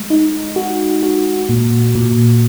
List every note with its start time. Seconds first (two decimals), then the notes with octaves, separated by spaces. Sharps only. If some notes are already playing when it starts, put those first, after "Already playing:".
Already playing: G#3
0.10 D#4
0.56 F#4
1.03 F#4
1.49 A#2
1.95 A#2